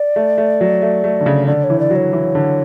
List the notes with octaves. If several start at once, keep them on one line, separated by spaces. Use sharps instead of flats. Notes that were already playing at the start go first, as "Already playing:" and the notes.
Already playing: D5
A3
A3
F#3
A3
A3
D3
C#3
D3 D5
C#5
E3
D5
F#3
C#5
E3
D3